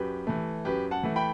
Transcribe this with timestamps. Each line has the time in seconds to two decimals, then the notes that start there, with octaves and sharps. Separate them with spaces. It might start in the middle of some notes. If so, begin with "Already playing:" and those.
Already playing: F#2 G4 B4
0.27 E3 A3
0.65 F#2 G4 B4
0.91 F#5 A5
1.03 E3 A3
1.16 G5 B5